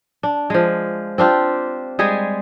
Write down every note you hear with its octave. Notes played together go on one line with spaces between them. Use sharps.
D4
F3 G#3
C4 D4 F4 G4
G3 G#3 G#4